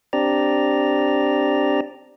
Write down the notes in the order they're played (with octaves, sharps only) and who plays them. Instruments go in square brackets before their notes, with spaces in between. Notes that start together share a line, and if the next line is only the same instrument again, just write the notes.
[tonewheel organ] C4 D4 G4 D5 A#5